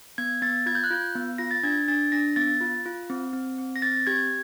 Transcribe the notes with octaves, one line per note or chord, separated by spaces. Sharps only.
B3 G#6
B3 A6
F4 G#6
G6
F#6
F4 G6
B3
F4 A#6
A6
D4 G#6
D4 A6
D4 A#6
B3 A6
F4
F4
C4
C4
C4
A#6
C4 A6
G4 G#6